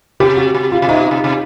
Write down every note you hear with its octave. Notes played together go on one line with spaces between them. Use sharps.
C3 G4
F#4
C3
F4
C3
B2 D#4
C3
C3